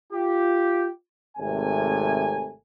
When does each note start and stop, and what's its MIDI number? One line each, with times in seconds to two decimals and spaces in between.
0.13 0.88 65
0.13 0.88 67
1.38 2.51 32
1.38 2.51 48
1.38 2.51 57
1.38 2.51 80